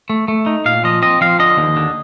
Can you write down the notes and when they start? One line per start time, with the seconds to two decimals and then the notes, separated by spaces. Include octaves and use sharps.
0.10 A3
0.28 A3
0.46 D#4
0.65 A#2 F5
0.84 F3 D#5
1.02 C4 D#5
1.21 F3 F5
1.39 D3 D#5
1.57 D#2
1.76 D3